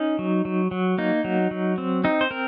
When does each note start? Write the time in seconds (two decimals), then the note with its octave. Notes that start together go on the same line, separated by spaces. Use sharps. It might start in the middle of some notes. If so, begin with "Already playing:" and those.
Already playing: C#4 D#4
0.19 F#3
0.45 F#3
0.71 F#3
0.98 A#3 D#4
1.24 F#3
1.51 F#3
1.78 C4
2.04 C4 D#4
2.21 C5
2.31 C4 A#4